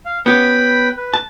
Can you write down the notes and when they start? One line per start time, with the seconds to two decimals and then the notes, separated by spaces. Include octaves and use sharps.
0.05 F5
0.26 B3 C#4 G4 B4 G5 B5
0.97 B4
1.14 A5